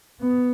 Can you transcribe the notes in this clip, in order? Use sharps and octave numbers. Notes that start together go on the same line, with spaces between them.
B3